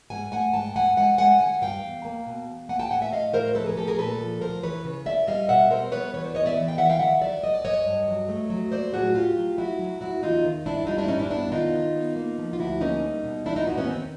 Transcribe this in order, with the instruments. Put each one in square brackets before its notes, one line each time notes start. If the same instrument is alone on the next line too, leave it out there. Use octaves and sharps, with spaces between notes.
[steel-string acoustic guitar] G#2 F#5 G#5
A3 F#5 G#5
G#2 G5 A5
G#2 F#5 G#5
G#3 F#5 G#5
G#3 F#5 G#5
D#3 F#5 G#5
G2 F5 G5
E2
A#3
B2
E2
A#3 F#5 G#5
G5 A5
A2 F#5 G#5
E5 F#5
A2 D#5 F5
A2 A#4 C5
F3 A4 B4
G#4 A#4
A3 G4 A4
G#4 A#4
A#2 A4 B4
F3
D2 A#4 C5
E3 B4 C#5
C#3
C#3 D5 E5
G3 D#5 F5
B2 E5 F#5
G3 A#4 C5
B3 B4 C#5
E3 B4 C#5
C5 D5
B3 C#5 D#5
D5 E5
E3
F5 G5
E3 E5 F#5
F5 G5
D#3 E5 F#5
F#3 D5 E5
F#2 D#5
D5
F#2 C#5 D#5
G2
F#3
A3
F#3
A#3 C5 D5
A2 F#4 G#4
A2 F4 G4
F#3
F#3 E4 F#4
F#3
F#3 E4 F#4
E2 D#4 F4
D#3
G2 D4 E4
G3 D#4 F4
D4 E4
G2 C#4 D#4
D4 E4
B3 D4 E4
D#3 D#4 F4
D#3
B3
A#3
F3
F4
D2 E4 F#4
A#3 C#4 D#4
G3
B2
E2 D4 E4
D#4 F4
B3 E4 F#4
B3 C#4
D#3 C4